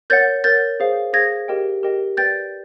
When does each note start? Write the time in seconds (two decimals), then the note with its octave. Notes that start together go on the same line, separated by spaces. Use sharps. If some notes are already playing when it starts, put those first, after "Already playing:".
0.10 A#4 C#5 F#5 G6 A6
0.44 A#4 C#5 F#5 G6 A6
0.80 G#4 C5 F5
1.13 G#4 C5 F5 G#6 A#6
1.48 G4 A#4 D#5 G5
1.83 G4 A#4 D#5 G5
2.17 B4 D5 G5 G6 A6